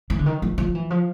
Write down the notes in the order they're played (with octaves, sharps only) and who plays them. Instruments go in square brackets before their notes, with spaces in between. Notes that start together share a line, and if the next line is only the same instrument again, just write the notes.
[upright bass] E3
D3
D#3
F3
F3
E3
F3